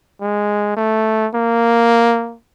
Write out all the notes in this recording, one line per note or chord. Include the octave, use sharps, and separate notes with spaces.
G#3
A3
A#3